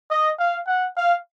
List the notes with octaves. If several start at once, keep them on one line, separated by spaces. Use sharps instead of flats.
D#5
F5
F#5
F5